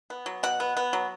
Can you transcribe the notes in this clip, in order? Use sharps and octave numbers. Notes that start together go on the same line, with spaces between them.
B3
F#3
B2 F#5
B3
B3
F#3